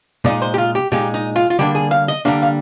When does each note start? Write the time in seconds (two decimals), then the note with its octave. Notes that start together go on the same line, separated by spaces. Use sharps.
0.25 A#2 G#3 D#4 D5
0.42 C5
0.54 G4
0.58 F4
0.75 G4
0.92 A#2 G#3 D#4 G4
1.14 D#4
1.36 F4
1.50 F4
1.59 D3 G3 A#3 D4 G4
1.75 G#4
1.91 F5
2.08 D#5
2.25 D3 G3 A#3 D4 F5
2.42 F5